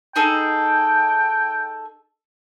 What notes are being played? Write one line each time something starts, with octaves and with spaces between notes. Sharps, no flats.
D#4 G#4 A4 G5